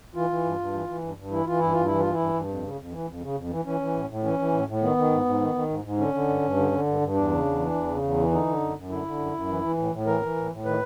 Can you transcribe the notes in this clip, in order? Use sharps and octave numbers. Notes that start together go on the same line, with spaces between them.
E3 F4
E3
G2
G2
E3
E3
G2
G2
E3 E4
E3 F4
G2 E4
G2 F4
E3 E4
F4
E3
E4
G2
G2
F2
C#3
F2
E3
F2
C#3
F2
E3
E3 C#4
E3
A2
A2
E3 C#4
E3
A2
A2
D#3 B3
D#3
G#2
G#2
D#3
D#3
G#2
G#2
D3 C#4
D3
G2
G2
D3
D3
G2
G2
E2 D4
C#3
E2
E3
E2
C#3
E2
E3
D3 D#4
D3
F#2
F#2
D3 E4
D3
F#2
F#2
E3
E3
A2
A2
E3 A#4
E3
A2
A2
D#3 B4